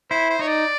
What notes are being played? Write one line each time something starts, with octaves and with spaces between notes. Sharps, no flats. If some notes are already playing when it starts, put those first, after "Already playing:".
E4 C5
C5
D#4 C#5
D5